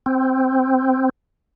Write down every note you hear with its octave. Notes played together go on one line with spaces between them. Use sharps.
C4